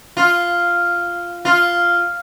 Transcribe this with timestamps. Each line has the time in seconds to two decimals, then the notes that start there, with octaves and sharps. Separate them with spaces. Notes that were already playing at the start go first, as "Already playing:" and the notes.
0.17 F4
1.45 F4